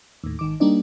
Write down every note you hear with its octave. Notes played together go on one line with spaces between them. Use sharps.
D#2 A2
G#1 D#3 D6
G3 A#3 D4 D#4 D5